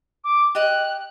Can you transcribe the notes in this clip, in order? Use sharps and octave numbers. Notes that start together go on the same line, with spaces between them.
D6
G4 D#5 D6 F#6